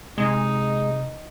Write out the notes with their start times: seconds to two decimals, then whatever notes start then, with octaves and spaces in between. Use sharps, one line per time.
0.18 C3 G#3 D#4